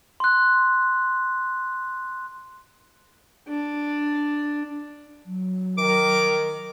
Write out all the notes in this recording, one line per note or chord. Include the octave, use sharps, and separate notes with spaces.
C6 F#6
D4
F#3
D#3 A#4 D6